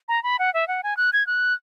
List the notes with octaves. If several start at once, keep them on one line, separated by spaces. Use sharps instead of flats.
A#5
B5
F#5
E5
F#5
G#5
F#6
G#6
F#6